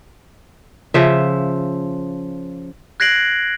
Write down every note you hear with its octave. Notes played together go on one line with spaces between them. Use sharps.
C#3 F3 E5
F#6 G#6 A#6 C7 D7 F#7